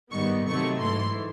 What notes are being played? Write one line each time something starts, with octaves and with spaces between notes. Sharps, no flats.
G#2 D#3 G3 B3 C#6
C3 D#3 F#3 A3 C#6
G#2 E3 A3 C6